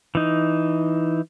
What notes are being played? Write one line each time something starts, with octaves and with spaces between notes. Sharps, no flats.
E3 D#4